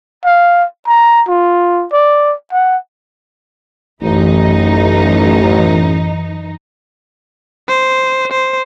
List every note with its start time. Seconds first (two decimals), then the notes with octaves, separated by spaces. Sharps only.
0.25 F5
0.87 A#5
1.28 F4
1.92 D5
2.53 F#5
4.02 A1 F#2 E3 D#4
7.68 C5
8.32 C5